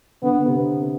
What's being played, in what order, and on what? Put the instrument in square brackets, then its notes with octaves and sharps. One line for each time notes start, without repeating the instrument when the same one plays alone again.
[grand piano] D3 [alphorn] B3
[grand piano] C3